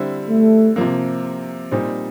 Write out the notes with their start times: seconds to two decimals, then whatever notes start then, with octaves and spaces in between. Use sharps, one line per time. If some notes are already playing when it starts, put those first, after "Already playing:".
Already playing: D3 G3 C4 E4
0.29 A3
0.76 C3 F3 A#3
1.71 A#2 G3 C4 D#4